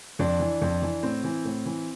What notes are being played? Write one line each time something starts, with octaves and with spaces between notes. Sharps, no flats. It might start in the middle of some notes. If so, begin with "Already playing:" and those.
F2 D4
E3
F2
E3
A2 C4
E3
A2
E3